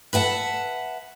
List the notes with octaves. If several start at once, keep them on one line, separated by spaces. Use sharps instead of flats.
B4 E5 F#5 A5